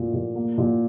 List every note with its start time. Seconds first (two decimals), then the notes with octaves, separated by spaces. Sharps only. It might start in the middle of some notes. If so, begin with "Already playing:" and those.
Already playing: A#2 A3 F4
0.13 A#2
0.35 A#3
0.58 A#2